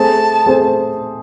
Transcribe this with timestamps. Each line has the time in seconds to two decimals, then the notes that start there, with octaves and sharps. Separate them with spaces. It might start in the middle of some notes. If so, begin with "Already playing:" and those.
Already playing: A3 C4 G#4 C5 A5
0.46 A3 C4 G#4 C5